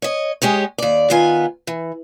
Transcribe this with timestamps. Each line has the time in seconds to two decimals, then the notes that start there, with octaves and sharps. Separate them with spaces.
0.02 C#5 D#5
0.42 G#3 G4 G#4 C#5
0.78 D#2 D5
1.10 D#3 B3 F4 G#5
1.67 E3